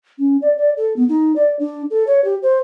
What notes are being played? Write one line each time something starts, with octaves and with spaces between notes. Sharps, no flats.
C#4
D5
D5
A4
B3
D#4
D5
D4
A4
C#5
G4
C5